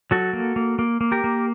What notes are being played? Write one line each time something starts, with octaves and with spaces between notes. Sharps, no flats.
F#3 F#4 A4
A#3
A#3
A#3
A#3
G4 A#4
A#3